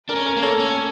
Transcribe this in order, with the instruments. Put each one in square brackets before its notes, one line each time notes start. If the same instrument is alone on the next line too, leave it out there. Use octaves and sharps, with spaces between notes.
[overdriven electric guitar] D4 [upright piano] A#4
[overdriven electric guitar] C#4
[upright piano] A#4
[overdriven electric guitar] A#3
[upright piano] A4 C#5
[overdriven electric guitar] C#4